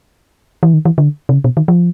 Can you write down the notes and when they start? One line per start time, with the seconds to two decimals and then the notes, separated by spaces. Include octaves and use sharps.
0.63 E3
0.74 D#3
0.85 E3
0.98 D3
1.29 C3
1.33 C#3
1.44 B2
1.57 D#3
1.68 F3